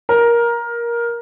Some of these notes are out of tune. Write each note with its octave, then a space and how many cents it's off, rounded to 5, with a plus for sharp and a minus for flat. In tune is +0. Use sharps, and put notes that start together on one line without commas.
A#4 +15